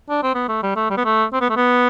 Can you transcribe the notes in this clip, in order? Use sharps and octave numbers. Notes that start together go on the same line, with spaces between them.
D4
C4
B3
A3
G3
A3
G3
B3
A3
C4
B3
A3
B3